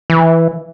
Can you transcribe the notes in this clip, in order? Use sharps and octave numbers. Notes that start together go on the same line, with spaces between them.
E3